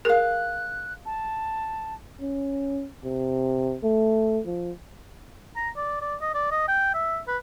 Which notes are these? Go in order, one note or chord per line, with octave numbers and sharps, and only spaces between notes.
G#4 A#4 F5 F#6
A5
C#4
C3
A3
F3
A#5
D5
D5
D#5
D5
D#5
G5
E5
B4